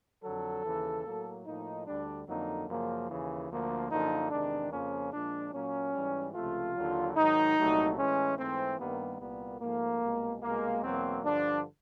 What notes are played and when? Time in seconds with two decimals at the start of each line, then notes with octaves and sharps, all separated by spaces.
0.24 F2 D3 F#3 A4
0.65 D#2 C#3 E3
1.06 A2 F#3 A#3
1.47 A2 F3 A#3 D#4
1.87 D2 D3 G3 D4
2.28 F2 D3 F#3 A#3 D#4
2.69 F#2 C#3 F3 A#3
3.09 D#2 C#3 E3
3.50 D2 D3 F3 A#3
3.91 F#2 D3 F3 A#3 D#4
4.31 E2 C3 D#3 G#3 D4
4.72 F2 C#3 F3 A#3 C#4
5.13 A#2 F3 G#3 D4
5.53 A#2 F#3 A#3 C#4
5.95 G#2 E3 G3
6.35 C#2 C3 F3 A3 F4
6.76 D#2 D3 F#3
7.17 G#2 D#3 F#3 D#4
7.58 C2 A#2 F#3 A3
7.98 A2 E3 G#3 C#4
8.39 G#2 E3 A3 C4
8.79 G2 D#3 G3 A#3 B3
9.20 C2 A#2 G3 A#3 B3
9.61 G#2 F3 A3 A#3
10.02 C2 B2 G#3
10.42 C2 B2 G#3 A#3
10.83 E2 B2 F#3 A#3 C4
11.24 G2 D3 F3 D4